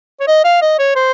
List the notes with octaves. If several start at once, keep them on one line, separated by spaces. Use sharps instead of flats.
C#5
D#5
F5
D#5
C#5
C5